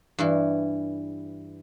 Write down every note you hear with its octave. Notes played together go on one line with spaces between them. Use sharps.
G2 E3